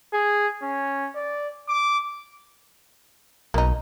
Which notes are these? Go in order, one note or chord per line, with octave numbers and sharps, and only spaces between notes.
G#4
C#4
D5
D6
B1 A#3 D#4